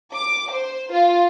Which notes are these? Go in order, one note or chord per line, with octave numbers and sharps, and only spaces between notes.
D6
C5
F4